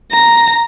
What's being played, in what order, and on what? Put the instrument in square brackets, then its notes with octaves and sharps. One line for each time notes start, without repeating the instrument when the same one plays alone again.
[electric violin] A#5